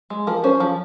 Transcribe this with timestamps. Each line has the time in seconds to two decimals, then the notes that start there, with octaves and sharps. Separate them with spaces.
0.10 G#3
0.27 F3 A#4
0.44 C#4 C5
0.60 F3